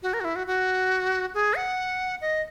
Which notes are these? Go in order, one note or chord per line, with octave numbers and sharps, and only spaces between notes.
F#4
A#4
F#4
E4
F#4
F#4
G#4
F#5
D#5